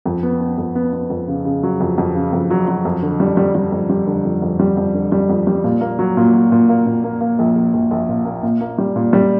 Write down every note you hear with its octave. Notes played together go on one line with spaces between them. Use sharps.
F2
B3
B3
F2
B3
B3
F2
C#3
C#3
F#3
F2
F2
C#3
F2
F#3
F#3
F2
D3
G3
G3
G3
F2
G3
D3
F2
F2
G3
F2
D3
G3
F2
G3
A#2
A#3
F#3
A#2
F#3
A#2
A#3
A#2
A#3
A#3
A#1
A#1
A#1
A#1
A#2
A#3
A#2
A#3
G3
A#2
G3